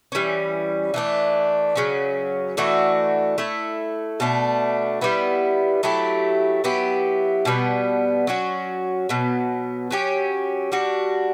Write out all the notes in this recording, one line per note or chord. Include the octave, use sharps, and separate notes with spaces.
E3 G3 C#4
E3 A3 D4
C#3 F#3 C#4
E3 A3 D4 F#4
A3 E4 A4
B2 A3 D4
G3 B3 E4
F#3 A3 E4 G4
F#3 B3 E4 G4
B2 G3 B3
F#3 C#4 F#4
B2 F#3 B3
F#3 C#4 G4
G3 D4 F#4